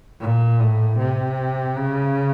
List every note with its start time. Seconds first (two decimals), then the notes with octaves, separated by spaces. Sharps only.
0.21 A#2
0.60 A2
0.99 C3
1.79 C#3